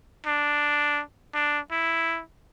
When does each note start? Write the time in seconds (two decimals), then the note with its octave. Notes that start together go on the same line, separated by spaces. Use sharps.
0.26 D4
1.34 D4
1.71 E4